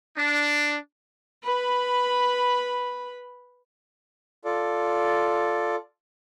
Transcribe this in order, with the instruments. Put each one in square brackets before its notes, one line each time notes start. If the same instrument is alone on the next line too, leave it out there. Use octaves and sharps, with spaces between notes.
[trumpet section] D4
[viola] B4 B5
[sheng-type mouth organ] F4 A4 D5